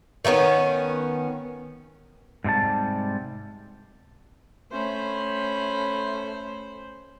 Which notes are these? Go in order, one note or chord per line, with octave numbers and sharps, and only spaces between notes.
D#3 A3 B3 C#4
G#2 C3 G3 A5
A3 C#4 C5 B5